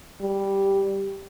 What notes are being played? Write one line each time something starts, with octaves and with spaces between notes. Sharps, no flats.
G3